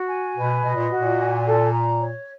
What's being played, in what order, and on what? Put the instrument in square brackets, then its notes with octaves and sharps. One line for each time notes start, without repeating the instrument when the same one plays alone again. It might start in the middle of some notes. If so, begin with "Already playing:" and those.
Already playing: [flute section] F#4
G#5
[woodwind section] B2 [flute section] B4
[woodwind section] B2 [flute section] D#5
[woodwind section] A#2
[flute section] F#4
[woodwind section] A#2
[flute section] G#5
A4
A#5
C#5